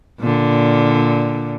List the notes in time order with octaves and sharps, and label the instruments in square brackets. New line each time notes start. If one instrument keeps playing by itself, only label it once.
[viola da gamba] A#2 D3